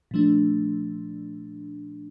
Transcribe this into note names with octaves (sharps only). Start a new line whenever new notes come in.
A#2 F3 A3 D4